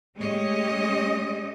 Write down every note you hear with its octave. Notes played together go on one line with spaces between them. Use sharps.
G#3 A3 C#4 G4 C#5 D#5